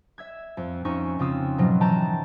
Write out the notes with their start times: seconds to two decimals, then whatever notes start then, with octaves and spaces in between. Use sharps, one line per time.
0.18 E5 E6 G#6
0.57 F2
0.85 F2 C#4 D#4 C#6 E6
1.19 F2 C#3 C4 F4 D#6 E6
1.58 G#2 B2 F3 F#3
1.80 E3 G5 A5 A#5 G6